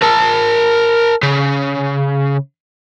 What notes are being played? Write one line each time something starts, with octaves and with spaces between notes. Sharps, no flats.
A#4 A5
C#3